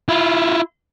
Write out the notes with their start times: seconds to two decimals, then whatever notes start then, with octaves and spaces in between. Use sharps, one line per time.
0.09 E4 F4